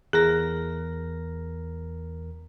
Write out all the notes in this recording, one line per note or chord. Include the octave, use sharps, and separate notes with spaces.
E2 G#4 A#4 A#6